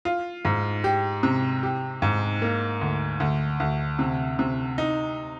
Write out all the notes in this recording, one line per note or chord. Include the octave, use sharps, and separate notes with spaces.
F4
G#2
G4
C3
G4
G#2
A#3
D2
D2
D2
C3
C3
D#4